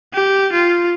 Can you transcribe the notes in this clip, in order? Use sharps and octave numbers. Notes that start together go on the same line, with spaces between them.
G4
F4